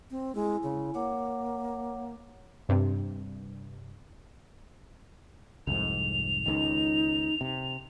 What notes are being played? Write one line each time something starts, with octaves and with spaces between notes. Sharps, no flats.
C4
G#3 E4 G#5
C#3
A#3 C#5 F#5 D6
G2 C3
C2 F2 G#2 F7
C#2 D#3 D#4
C3